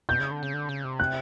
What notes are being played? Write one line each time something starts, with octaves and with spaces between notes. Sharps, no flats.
B2 G6
C#3
D3
C#3
D3
C#3
C3
F#6